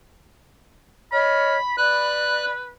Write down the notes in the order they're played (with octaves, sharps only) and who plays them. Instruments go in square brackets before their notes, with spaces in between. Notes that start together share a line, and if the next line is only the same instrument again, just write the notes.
[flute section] C#5 D#5 F6 [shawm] B5
[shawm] B4 [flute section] D5 B5 [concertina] F#6